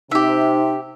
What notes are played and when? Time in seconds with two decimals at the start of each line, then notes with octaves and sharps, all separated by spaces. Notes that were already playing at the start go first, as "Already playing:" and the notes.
0.11 C3 D#4 G4 E5